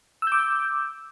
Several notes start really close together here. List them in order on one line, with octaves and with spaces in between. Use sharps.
E6 G6 D6